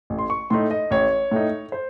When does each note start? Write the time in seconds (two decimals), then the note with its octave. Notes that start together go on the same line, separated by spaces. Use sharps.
0.10 A1
0.19 C6
0.30 C#6
0.50 A2 A3 D#4 C6
0.71 D#5
0.91 A1 C#5
1.32 A2 A3 D#4
1.72 C5